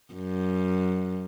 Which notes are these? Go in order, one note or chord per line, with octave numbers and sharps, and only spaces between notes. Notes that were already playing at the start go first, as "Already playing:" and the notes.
F#2